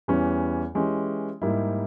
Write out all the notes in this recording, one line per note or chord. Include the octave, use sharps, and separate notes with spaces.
E2 E3 G3 C#4
E3 G#3 C#4 G4
G#2 G3 A#3 E4 G4